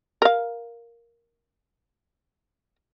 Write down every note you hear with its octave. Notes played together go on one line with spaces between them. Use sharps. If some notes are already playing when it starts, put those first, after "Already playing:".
A#4 F5